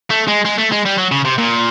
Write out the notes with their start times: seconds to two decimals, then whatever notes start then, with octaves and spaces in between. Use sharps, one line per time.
0.10 A3
0.28 G#3
0.45 G#3
0.58 A3
0.72 G#3
0.85 G3
0.98 F#3
1.12 C#3
1.25 C3
1.38 A#2